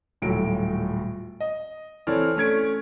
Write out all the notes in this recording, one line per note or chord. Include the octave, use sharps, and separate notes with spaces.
D#1 A2 F#3 D7
D#5
E3 C4 A4 C#5 D5 F6
A3 C#4 G#6 D7